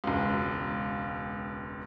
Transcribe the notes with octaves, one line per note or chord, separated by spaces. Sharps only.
E1 C#2